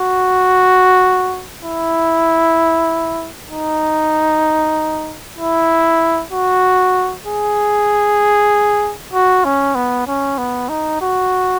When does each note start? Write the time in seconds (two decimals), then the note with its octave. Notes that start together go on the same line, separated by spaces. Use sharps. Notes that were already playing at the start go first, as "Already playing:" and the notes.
Already playing: F#4
1.63 E4
3.50 D#4
5.39 E4
6.32 F#4
7.26 G#4
9.14 F#4
9.45 C#4
9.75 B3
10.07 C#4
10.38 B3
10.69 D#4
11.01 F#4